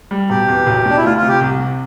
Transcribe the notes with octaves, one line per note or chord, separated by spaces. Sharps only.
G3
E1 G4
E2
B1
B2 D4
E4
D2 F4
F4
C3
G4
C2
C3